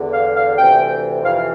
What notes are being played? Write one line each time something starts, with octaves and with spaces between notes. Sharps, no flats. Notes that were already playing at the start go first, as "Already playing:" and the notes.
Already playing: E2 D3
F5
F5
D2 C3 E3 G5
F2 C3 E3 F5